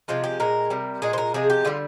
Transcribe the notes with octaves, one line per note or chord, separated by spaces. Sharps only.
C3 F3 G#3 F4
G4
A#2 G#3 A#4
C3 G3
A#2 G#3 G#4
C5
A#4
C3 F3 G#3 G#4
G4
D3 G3 F4